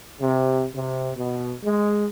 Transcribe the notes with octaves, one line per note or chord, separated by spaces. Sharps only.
C3
C3
B2
G#3